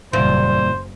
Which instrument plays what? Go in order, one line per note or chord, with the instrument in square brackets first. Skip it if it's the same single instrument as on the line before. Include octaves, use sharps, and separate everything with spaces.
[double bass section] F#1 [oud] E2 A#2 [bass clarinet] G3 [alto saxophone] C5